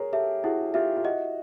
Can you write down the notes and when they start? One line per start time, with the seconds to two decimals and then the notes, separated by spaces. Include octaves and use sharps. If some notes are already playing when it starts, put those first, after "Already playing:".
Already playing: G#4 A#4 C#5
0.13 G4 A4 E5
0.44 E4 F#4 G#4
0.74 F4 G4 E5
0.96 F4
1.04 F#4 D#5